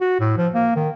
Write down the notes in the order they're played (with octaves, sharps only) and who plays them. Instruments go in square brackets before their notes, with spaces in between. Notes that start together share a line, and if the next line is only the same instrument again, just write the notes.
[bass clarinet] F#4
A2
F3
A#3
D#3